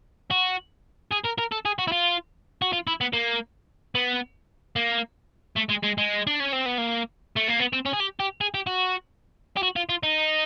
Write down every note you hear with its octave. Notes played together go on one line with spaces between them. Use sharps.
F#4
G#4
A#4
A#4
A4
G#4
F#4
E4
F4
F#4
F4
E4
B3
A#3
B3
A#3
A3
G#3
G#3
G#3
D4
C#4
C4
B3
A#3
A3
A#3
B3
C4
C#4
G#4
G4
G4
G#4
G4
F#4
G4
F#4
F4
F4
D#4